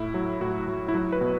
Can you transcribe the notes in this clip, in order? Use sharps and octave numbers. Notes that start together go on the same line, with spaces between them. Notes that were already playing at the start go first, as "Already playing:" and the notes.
Already playing: A2 E4
F#3
A2 F#4
F#3
E4
F#3 F#4
B4
B2